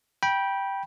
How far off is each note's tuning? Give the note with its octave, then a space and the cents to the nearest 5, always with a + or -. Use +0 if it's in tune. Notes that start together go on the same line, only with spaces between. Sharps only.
G5 +0 B5 -25